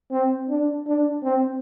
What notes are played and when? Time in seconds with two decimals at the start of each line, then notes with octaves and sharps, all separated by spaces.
0.11 C4
0.49 D4
0.87 D4
1.23 C4